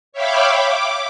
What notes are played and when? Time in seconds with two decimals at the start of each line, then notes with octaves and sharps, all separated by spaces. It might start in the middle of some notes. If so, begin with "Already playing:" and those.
0.12 C#5 E5 F5 G5 B5 D6
0.55 D6